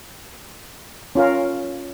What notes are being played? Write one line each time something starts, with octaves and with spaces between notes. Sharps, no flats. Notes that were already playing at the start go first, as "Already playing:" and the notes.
C#4 F4 A#4 F5